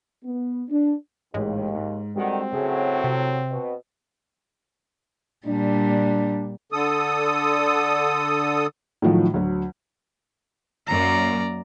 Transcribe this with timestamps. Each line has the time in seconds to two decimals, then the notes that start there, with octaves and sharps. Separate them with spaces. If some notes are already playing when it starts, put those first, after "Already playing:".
0.24 B3
0.69 D4
1.34 A1 D#2 G#2 G#3
1.75 G#2
2.16 D3 D#3 G3 C4 F#4 F#5
2.52 A2 C#3 F#3 G#4
3.04 C3 E5
3.50 B2
5.47 A#2 G3 D4
6.72 D3 A4 D#6
9.02 A2 D#3 F3 F#3
9.34 D2 F#3
10.87 F#2 A#3 D5 A#5